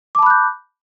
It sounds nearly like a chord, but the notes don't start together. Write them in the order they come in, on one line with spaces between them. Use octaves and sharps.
D6 A5 B5 F#6 G6